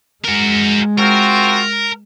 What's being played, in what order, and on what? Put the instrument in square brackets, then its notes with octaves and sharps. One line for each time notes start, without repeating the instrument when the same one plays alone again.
[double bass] G#3 [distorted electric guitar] F#4 A#4
[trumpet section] C4 F4 F#4 [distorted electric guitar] A#4